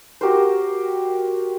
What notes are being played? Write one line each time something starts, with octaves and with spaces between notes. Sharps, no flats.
F#4 G4 A#4 C5